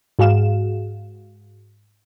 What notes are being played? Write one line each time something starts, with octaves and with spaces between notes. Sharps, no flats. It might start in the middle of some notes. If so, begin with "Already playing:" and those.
G#2 F#4 G#4 F5 E7